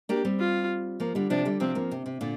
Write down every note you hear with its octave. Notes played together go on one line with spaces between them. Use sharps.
A#3 D4 G4
G3 C4
F4
F3 A#3
D3 G3
C3 F3 D4
D3 G3
C3 F3 C4
F3 A#3
C3
C3
A#2 D3